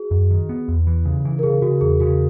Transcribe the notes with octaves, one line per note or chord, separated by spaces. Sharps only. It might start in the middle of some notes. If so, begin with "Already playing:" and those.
Already playing: F#4 G#4
F#2
D#3
B3
E2
E3
C#3
E3
A#4
C#3 G#4
C#3 F#4
E2 G#4
C#3 F#4